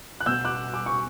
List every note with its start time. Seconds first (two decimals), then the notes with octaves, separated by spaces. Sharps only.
0.20 F#6
0.26 B2 E6 G6
0.45 D6 F#6
0.74 D6
0.86 C#6